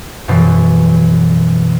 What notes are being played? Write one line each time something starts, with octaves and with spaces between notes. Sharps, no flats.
F#2 B2 E3 F3 G3